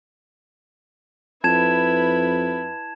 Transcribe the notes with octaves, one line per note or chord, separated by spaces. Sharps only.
F2 E4 B4 A5 G#6 E7